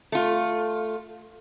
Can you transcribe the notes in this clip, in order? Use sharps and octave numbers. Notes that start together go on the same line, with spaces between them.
A3 F4